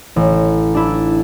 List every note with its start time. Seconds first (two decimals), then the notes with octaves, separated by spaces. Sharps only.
0.16 A1
0.74 D4 E4